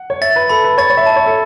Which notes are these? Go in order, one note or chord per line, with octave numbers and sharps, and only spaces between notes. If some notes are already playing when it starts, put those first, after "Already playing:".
Already playing: F#5
C#5
E5 A6
B4
A4 B5
B4
C#5 A6
C#5
E5
A5
E5
C#5
A4